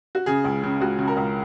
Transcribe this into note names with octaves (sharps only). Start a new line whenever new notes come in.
F#4
C#3 G#4
C#2
C#3
C#2 F#4
C#3
A#4
C#2